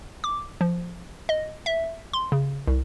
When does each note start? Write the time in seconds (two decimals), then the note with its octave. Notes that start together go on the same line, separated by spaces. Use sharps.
0.24 D6
0.61 F3
1.29 D#5
1.66 E5
2.13 C6
2.32 C#3
2.67 C2